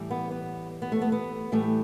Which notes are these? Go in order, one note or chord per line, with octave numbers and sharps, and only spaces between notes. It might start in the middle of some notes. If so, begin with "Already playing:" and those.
Already playing: A2 E3 G3
B3
B3
B3
A3
B3
B3
A2 E3 G3 A3